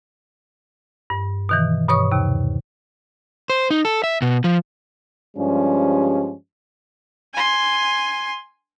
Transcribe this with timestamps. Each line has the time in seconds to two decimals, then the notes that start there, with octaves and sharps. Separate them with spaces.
1.10 G2
1.49 B2 D#3 E3
1.88 G2 B2 C#5 C#6 D#6
2.12 D#2 C3
3.50 C5
3.71 D#4
3.85 A4
4.04 E5
4.22 B2
4.44 F3
5.37 G2 F3 G3 G#3 C#4
7.34 G#5 C6